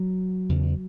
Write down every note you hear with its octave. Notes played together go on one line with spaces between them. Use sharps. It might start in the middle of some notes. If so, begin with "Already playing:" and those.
Already playing: F#3
E2 C#3